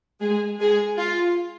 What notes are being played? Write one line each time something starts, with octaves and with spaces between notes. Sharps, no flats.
G#3 G#4
G#3 G#4
F4